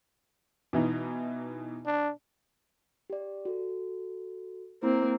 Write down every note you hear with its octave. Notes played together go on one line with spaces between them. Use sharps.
B2 E3 D#4
D4
G4 D5
F#4 A4
A#3 C4 E4 A#5